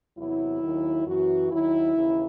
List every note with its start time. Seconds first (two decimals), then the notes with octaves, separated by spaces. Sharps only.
0.18 E2 C3 F#3 E4
0.62 D#2 D#3 F#3
1.06 F#2 E3 F#4
1.51 D#2 D#3 F#3 E4
1.95 D#2 C#3 E3